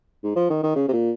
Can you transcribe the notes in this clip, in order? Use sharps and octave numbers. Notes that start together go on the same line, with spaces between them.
G#2
F3
D#3
D#3
C#3
C3
A#2